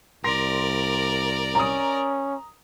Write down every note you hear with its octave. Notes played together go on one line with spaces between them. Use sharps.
C2 A#4 D5 C6 A#6
C#4 A#5 D#6